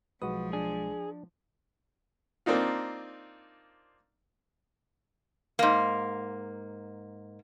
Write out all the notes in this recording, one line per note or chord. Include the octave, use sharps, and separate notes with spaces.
B1 F3 G#3 F#4 B4 D#6
D4 G#4
A#3 C4 D4 D#4 F4
G#2 A#3